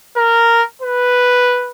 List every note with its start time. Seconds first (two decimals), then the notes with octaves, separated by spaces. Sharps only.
0.17 A#4
0.82 B4